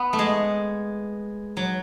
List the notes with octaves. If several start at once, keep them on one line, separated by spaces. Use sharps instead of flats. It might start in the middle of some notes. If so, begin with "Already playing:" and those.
Already playing: B3
A3
G#3
F#3